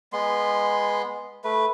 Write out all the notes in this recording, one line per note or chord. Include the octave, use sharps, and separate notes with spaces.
G#3 B3 C6
A3 B4